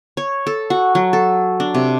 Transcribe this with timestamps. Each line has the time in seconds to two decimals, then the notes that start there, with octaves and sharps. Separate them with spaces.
0.17 C#5
0.47 A4
0.70 F#4
0.95 F#3
1.13 A4
1.60 D4
1.74 C3